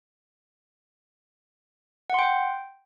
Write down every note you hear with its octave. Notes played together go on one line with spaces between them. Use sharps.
F#5 G5 C6